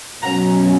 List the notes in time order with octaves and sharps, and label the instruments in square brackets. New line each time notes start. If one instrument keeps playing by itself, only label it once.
[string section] B2 F#3 C#4 F#5 A#5